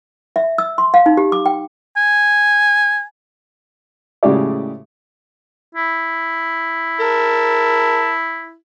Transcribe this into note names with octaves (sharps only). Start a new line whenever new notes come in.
E5
E6
C6
F5
D#4
G4
D6
G5
G#5
A2 C#3 G#3 F#4 G4 D5
E4
A#4 A5